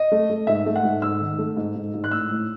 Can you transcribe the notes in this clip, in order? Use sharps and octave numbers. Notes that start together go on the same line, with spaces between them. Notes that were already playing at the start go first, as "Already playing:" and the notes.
Already playing: D#5
A3
A3
G#2 E5
A3
F#5
G#2
G#2 E6
D#3
A3
G#2
G#2
G#2
F#6
A2 E6
A2